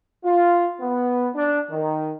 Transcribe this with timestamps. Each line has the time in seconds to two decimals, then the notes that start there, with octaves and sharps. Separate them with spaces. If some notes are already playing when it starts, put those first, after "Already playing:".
0.25 F4
0.80 B3
1.35 D4
1.70 D#3